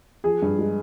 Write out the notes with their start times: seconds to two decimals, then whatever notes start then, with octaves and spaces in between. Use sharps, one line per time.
0.24 F3 G#4
0.42 G2
0.59 G#3